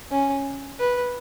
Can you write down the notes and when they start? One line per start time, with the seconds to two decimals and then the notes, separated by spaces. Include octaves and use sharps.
0.11 C#4
0.79 B4